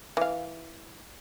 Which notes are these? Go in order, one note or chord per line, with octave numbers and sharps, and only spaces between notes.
E3 F5